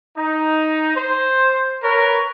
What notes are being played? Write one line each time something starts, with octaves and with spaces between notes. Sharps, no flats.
D#4
C5
A#4 B4 C#5